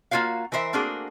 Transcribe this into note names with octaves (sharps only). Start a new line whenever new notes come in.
A#3 F4 F#4 C#5 F5
E3 A#4 C5 C#5 E5
A3 A#3 C4 D4 F#4 G#4